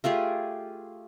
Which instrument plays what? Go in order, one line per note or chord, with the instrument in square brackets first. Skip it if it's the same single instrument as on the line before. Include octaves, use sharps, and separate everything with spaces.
[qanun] A3 F4 G4 G#4